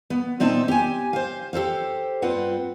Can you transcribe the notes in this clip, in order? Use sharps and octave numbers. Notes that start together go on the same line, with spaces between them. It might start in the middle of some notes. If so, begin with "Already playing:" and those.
B3
A#2 C4 D#4 E5 A5
G4 G#5
C5 F5
G4 A4 C5 F5
G2 C4 F4 B4 F#5